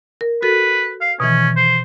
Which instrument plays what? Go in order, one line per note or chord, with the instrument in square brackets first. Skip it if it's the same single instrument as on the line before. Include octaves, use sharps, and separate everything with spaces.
[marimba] A#4
[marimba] F#4 A4 [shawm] B4
[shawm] F5
[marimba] B2 D#3 E3 [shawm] C#4
[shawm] C5